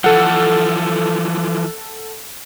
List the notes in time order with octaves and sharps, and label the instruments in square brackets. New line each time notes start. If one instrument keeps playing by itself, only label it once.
[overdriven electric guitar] E3 F3 [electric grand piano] A4 F#5